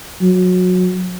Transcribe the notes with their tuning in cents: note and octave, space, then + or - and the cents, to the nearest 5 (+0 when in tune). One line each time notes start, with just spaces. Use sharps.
F#3 -25